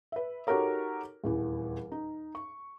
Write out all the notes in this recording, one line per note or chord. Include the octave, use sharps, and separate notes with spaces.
B4 E5
D#4 F#4 G4 A4 A#4 C#5
D#1 E2 E3
D#4
C#6